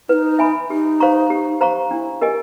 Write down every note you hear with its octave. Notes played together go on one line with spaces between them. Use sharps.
D#4 E4 B4
E5 G#5 B5
D#4 G4
C5 F5 A#5 C#6
G4
C5 F5 A#5 C#6
D4 E4
G4 A#4 D#5 G#5